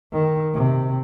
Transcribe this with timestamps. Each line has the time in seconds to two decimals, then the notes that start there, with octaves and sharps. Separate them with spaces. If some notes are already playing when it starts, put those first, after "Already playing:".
0.12 D#3
0.54 C3